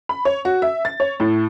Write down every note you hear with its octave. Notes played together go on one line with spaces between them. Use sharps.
B5
C#5
F#4
E5
A6
C#5
A2